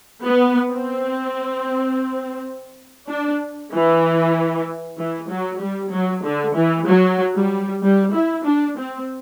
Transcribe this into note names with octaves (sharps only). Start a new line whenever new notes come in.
B3
C4
D4
E3
E3
F#3
G3
F#3
D3
E3
F#3
G3
G3
E4
D4
C4